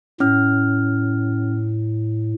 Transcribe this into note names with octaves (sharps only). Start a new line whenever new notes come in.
A2 C#4 F6